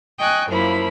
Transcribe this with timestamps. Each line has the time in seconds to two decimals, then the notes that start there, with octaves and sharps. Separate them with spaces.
0.18 D#5 G5 G#5 C#6 F#6
0.48 F#2 F3 A#3 E4 B5